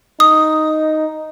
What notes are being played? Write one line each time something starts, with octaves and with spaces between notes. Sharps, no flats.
D#4 D#6